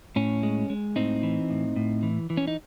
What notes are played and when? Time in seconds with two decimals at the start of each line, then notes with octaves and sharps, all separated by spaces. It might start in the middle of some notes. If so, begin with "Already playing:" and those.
0.16 A2 C#4
0.43 G#3
0.70 G#3
0.96 A2 C4 D#4
1.23 E3
1.50 A2
1.76 A2
2.03 E3
2.30 E3
2.37 C#4
2.47 D#4